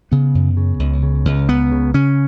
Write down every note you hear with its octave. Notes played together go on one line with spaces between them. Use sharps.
C#3 B3
F#2
C#3
C#2
C#3
C#2
C#2 B3
C#3
C#3 C#4